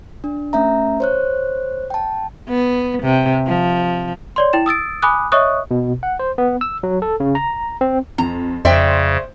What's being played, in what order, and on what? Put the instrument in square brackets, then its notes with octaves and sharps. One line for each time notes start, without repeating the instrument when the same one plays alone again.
[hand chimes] D4
A3 C#4 E5 A#5
C5 C#5 F#6
G5 A5
[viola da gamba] B3
C3
F3
[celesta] C#5 D5 C6
E4 G5 E7
D#6 E6 A6 D7
G#5 B5 D6 D#6 F#6
C#5 D#5 E5 C#6 D#6 F#6
[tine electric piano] B2
F#5
C5
B3
E6
F#3
A4
C#3
A#5
C4
[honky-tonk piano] F2 [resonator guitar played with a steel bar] A#5
[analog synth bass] F2 [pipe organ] C#3 [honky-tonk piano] C5 [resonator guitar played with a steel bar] D5 E5 G5